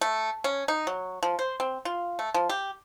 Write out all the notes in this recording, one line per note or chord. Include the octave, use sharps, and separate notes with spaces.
A3
C#4
D#4
F#3
F3
C5
C4
F4
A3
F3
G4